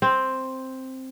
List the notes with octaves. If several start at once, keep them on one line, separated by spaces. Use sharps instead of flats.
C4